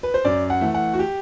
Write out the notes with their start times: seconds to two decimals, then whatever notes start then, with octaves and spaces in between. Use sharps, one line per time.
0.03 B4
0.14 C5
0.25 F#2 D5
0.50 F#5
0.61 E3 A3
0.74 F#5
0.94 F#4
0.99 G4